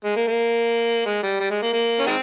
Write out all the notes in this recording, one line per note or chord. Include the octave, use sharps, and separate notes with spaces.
G#3
A#3
A#3
G#3
G3
G3
G#3
A#3
A#3
C#4
D#3 G#3 C4